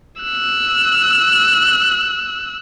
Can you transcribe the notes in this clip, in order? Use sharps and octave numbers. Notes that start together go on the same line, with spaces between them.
E6 F#6